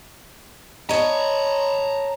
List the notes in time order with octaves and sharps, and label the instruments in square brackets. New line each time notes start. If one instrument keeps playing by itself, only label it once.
[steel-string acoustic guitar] C#5 D#5 [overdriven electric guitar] A5 A#5